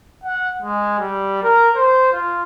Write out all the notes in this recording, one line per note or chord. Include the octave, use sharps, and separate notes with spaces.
F#5
G#3
G3
A#4
C5
F4